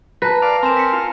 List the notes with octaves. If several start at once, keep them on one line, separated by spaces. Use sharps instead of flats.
B4 A5 A#5 A#6
D5 F5
C4 A#4 G#5 E7
B6 C#7
F4